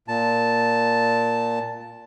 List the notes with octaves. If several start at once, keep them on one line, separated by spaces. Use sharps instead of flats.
A#2 A5